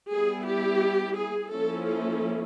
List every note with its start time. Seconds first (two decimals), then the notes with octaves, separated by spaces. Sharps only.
0.11 G3 B3 E4 G#4
0.47 G4
1.17 G#4
1.52 F3 A#3 C#4 E4 A4
1.88 A4